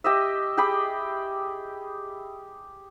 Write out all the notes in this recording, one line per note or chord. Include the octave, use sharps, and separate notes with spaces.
G4 D#5 E5
G4 G#4 G5 B5